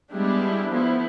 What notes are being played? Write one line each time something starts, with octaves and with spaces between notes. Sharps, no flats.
G3 G#3 B3 D4 E4 G4
F3 A3 B3 E4